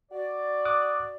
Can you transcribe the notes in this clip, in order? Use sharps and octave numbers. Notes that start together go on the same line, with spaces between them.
F#4 D5
D6 D#6 F#6